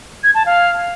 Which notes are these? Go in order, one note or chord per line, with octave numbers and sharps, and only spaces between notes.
G#6
A5
F5